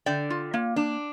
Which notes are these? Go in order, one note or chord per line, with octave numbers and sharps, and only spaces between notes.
D3 D5 G5
F4
A#3
D4